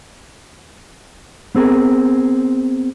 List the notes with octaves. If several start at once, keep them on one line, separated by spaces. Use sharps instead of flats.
B3 C4 G#4 A#4